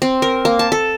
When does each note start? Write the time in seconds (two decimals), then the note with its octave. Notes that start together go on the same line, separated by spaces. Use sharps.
0.02 C4
0.22 A#4
0.45 A#3
0.59 A5
0.72 A4